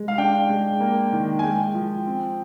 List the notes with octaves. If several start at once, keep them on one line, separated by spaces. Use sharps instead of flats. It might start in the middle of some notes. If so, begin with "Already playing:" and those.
Already playing: G#3
F5
D4 G5
G#3
A#3
D#3
G#5
G#3 G5
F3
C4